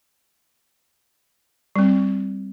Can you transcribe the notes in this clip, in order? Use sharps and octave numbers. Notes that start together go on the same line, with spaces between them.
G3 C4